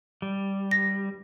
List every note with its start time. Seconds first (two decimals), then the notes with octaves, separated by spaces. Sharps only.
0.22 G3
0.71 A#6